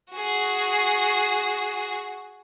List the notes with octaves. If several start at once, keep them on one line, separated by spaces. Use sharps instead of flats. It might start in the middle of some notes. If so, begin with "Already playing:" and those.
F#4 G#4